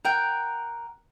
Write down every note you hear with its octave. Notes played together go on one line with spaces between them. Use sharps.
A#4 F#5 G5